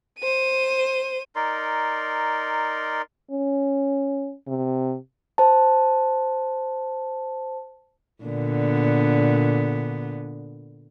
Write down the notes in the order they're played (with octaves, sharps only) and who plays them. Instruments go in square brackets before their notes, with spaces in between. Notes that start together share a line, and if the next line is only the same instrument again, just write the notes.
[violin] C5 D#7
[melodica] D#4 A#4 D5 C6
[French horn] C#4
C3
[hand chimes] C5 A5
[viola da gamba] A#2 D3 B3